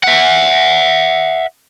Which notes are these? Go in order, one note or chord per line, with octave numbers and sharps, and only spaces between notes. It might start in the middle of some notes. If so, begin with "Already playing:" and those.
E5 F#5